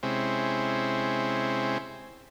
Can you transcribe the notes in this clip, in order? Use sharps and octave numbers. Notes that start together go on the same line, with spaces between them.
C3 G#3 C4 C#4 E4